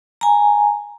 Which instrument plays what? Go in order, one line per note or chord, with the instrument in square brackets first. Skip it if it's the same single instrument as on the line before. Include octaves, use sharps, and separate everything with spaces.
[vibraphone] G#5 A#5